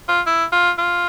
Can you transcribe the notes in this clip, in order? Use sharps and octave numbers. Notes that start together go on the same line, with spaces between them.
F4
E4
F4
F4